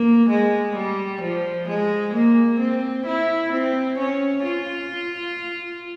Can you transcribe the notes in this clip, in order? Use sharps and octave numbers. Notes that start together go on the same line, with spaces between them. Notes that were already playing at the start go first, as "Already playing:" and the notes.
Already playing: A#3
G#3
G3
F3
G#3
A#3
C4
E4
C4
C#4
F4